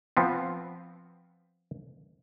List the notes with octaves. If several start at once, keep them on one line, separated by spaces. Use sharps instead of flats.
F3 B3 C4